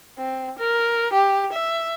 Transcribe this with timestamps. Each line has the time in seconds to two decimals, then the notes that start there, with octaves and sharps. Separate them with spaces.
0.18 C4
0.59 A#4
1.13 G4
1.52 E5